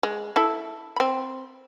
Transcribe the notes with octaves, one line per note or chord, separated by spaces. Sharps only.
G#3
E4 A4
C4 B5